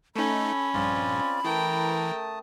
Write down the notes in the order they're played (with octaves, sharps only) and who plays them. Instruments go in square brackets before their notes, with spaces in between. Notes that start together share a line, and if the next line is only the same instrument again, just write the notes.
[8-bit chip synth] A3 D#4 [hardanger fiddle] C#4 [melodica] A4 [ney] B5
[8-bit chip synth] A#1 G2 [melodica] C4 F4 D5
[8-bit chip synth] E3 [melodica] A3 A5 D#6 [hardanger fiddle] A#4 G5